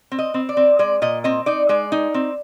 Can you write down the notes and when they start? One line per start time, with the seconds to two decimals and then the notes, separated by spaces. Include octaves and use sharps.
0.12 C4
0.19 D#5
0.34 C4
0.49 D5
0.57 C4
0.79 G#3 D5
1.02 A#2 D#5
1.24 C4 D#5
1.46 D#4 D5
1.69 G#3 D5
1.92 D#4
2.14 C4